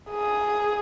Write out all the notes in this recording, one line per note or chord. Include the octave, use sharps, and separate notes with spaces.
G#4